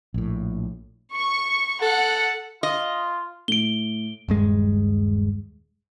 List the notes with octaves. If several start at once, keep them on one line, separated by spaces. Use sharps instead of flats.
A#1 A2
C#6
A4 F#5
F4 D#5
A2 D7 G7
D#1 G2 G#3